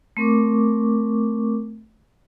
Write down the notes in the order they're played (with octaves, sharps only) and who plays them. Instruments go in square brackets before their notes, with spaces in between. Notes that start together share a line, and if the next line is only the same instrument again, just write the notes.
[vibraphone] A3 C4 A#4 C#6 D6